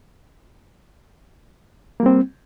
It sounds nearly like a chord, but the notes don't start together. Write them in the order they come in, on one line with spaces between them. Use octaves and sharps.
A#3 G3 C4